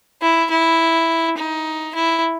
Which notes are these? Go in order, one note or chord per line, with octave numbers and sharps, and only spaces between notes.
E4
E4
D#4
E4